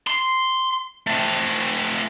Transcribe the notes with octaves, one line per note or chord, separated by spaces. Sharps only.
C6
A3 C4